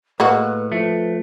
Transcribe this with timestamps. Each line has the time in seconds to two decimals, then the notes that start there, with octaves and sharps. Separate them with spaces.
0.20 A2 G#3 A#3 F#4 B4
0.72 F3 A3 B4